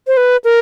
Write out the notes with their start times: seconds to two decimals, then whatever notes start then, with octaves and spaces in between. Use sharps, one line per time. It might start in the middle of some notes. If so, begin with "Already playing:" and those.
0.07 C5
0.17 B4
0.44 A#4